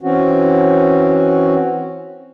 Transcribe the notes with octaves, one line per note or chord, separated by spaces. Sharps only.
E3 C4 C#4 F#4